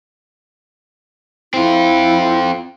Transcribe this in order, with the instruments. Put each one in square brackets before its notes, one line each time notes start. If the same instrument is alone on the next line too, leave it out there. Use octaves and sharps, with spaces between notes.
[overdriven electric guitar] C4 F4 [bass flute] E4